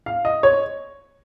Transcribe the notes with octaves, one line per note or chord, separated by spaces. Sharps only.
F5
D#5
C#5